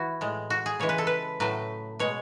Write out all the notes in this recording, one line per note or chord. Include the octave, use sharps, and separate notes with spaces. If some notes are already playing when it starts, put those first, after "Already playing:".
Already playing: E3 E4 F#4
A2 G#3
F#4
G#4
C#3 E3 G#3 C#5
B4
A4
B4
A2 F#3 A3 B4
B2 G#3 C#5